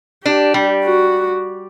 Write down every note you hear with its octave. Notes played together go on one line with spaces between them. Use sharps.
D4 G4
G3
F#4